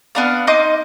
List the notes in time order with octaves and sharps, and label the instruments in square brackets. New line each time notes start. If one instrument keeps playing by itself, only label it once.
[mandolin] B3 D4 F5
D#4 D#5 C6 D6